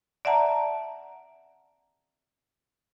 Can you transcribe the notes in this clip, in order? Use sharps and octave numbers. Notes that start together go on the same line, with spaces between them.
D5 E5 F#5 A5 A#5